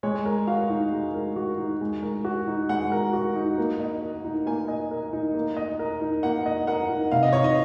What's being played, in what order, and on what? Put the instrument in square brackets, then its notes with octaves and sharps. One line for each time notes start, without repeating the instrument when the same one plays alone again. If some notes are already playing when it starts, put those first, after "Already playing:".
[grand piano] G#3 [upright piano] C#5
[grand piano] A#4
[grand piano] F#4 [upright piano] F5
[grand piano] D#4
G#3
A#4
F#4
D#4
G#3
A#4
F#4
D#4
[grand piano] G#3 [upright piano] F#5
[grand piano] A#4
F#4
D#4
A#3
D#5
A#4
D#4
[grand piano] A#3 [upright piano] G#5
[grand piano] D#5
A#4
D#4
A#3
D#5
A#4
D#4
[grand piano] A#3 [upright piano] F#5
[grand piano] D#5
[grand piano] A#4 [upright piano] F#5
[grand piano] D#4
[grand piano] C3 [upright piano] F5
[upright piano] D#5
[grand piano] D#4 [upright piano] C#5
[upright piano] D#5